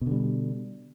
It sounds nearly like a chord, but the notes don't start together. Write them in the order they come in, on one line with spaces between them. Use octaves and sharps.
B2 D3 G3